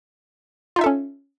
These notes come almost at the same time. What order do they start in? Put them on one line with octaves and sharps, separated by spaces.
F4 D#4 E5 A4 C#4